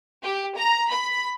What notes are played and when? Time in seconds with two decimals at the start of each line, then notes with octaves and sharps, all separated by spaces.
0.23 G4
0.56 A#5
0.90 B5